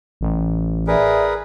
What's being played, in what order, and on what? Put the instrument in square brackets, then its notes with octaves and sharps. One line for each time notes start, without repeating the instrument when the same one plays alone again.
[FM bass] A1
[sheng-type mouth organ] G#4 A#4 B4 [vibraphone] D5 E5